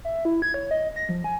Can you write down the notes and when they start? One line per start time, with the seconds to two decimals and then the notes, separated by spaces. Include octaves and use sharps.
0.05 E5
0.25 E4
0.42 G#6
0.54 C#5
0.71 D#5
0.96 A#6
1.09 F3
1.24 G#5